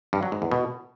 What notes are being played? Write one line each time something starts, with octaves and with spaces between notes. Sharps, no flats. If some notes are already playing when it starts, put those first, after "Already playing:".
G2
F#3
G#2
E2
B2